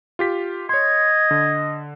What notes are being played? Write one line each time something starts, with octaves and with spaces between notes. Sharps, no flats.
F4 G4 B6
C#5 D#5 C6 G#6
D3